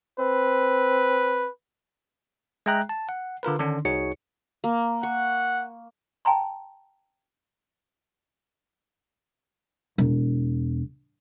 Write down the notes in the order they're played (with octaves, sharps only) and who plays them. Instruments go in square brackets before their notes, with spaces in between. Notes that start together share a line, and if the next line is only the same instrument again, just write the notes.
[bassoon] C4 [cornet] B4
[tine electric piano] G#3 G#4 E5 G5 A#5 F#6
A5
F#5
D3 F4 A#4 B4
D3 D#3 C#4 D4
C2 D#4 F#4 G#4 C#5 C#7
[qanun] A#3
[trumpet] F#5 [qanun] C#6
[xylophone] G5 A5 A#5 C6
[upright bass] E1